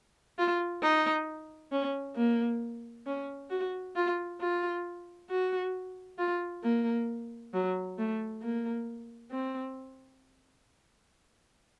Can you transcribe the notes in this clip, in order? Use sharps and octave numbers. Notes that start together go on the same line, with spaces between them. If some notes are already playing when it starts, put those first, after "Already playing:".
F4
D#4
C#4
A#3
C#4
F#4
F4
F4
F#4
F4
A#3
F#3
A3
A#3
C4